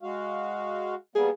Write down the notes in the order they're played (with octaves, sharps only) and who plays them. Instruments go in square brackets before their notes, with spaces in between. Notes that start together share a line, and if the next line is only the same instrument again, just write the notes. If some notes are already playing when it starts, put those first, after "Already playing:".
[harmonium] G#3 F#4 F5
[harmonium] G3 A#3 B3 [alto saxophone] G#4